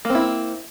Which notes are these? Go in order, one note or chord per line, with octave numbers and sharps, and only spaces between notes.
A#3 C4 E4